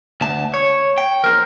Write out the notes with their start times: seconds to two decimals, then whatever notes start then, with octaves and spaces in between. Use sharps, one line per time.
0.21 D2 A5
0.54 C#5
0.98 G5
1.24 A#4 C5